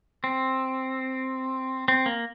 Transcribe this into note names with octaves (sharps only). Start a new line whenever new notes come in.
C4
C4
A#3